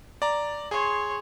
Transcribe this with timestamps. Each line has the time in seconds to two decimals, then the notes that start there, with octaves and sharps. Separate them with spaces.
0.22 D5 A#5
0.71 G#4 C#5 C6